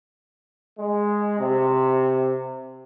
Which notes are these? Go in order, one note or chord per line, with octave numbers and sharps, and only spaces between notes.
G#3
C3